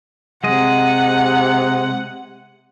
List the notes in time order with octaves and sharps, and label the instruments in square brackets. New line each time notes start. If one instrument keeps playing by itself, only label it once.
[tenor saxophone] C3 [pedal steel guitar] G#3 D#5 [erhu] F#5